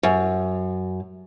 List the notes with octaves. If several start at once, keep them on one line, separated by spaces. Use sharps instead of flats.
F#2